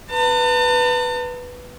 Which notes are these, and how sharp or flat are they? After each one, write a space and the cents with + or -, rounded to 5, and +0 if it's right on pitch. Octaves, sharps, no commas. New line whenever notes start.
B4 +0 A5 +45